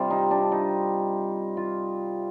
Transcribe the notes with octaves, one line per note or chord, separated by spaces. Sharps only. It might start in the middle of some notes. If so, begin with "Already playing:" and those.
Already playing: C3 G3 F4
D#4
D4
D#4
F4